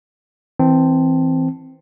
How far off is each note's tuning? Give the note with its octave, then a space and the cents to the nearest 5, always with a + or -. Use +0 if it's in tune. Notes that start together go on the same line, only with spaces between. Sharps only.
E3 -20 C4 +0 A5 +0